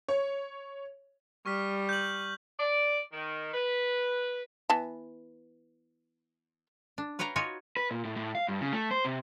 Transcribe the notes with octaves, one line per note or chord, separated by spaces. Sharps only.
C#5
G3 C#6 F6 B6
G6 F#7
D5
D#3
B4
E3 B3 A5
D4
B4 C#5 F5 G5 A#5
D#4 F4 F#4 C#5 G#5
B4
A#2
A2
A2
F5
G2
C#3
A3
C5
C3